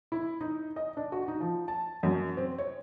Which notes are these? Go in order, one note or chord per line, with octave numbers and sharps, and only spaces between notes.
E4
D#4
D#5
D4
F#4
D#4
F3
A5
F#2
C4
C#5